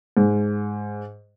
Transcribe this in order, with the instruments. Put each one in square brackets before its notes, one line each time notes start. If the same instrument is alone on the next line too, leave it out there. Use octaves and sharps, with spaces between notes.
[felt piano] G#2